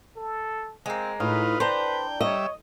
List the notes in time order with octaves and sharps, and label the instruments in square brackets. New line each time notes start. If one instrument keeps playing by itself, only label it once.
[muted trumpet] A4
[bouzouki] G#3 A#3 [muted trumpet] C4
[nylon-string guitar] A2 [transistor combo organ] D#4 F4 [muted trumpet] B4
[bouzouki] D4 A#5 [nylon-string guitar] C5 [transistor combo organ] G5
[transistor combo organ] G3 E5 [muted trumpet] C#5 [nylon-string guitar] D#5